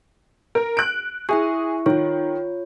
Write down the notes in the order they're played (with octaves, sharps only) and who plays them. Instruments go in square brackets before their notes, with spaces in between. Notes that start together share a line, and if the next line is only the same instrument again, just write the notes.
[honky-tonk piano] A#4
F#6 D7
[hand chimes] E4 E5 C#6 [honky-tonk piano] G#4
[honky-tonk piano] D#3 [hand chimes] F4 C#5